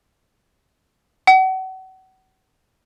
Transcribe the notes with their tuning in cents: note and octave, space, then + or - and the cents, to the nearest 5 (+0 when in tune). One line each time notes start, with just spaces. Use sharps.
F#5 +35